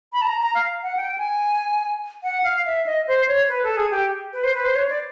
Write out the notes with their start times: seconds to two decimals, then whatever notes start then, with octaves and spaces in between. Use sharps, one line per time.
0.13 B5
0.22 A5
0.27 A#5
0.41 A#5
0.55 F5
0.83 F#5
0.97 G5
1.18 G#5
2.23 F#5
2.44 F5
2.65 E5
2.86 D#5
3.07 C5
3.28 C#5
3.49 B4
3.63 A4
3.77 G#4
3.91 G4
4.33 B4
4.44 C5
4.54 B4
4.65 C5
4.75 C#5
4.89 D5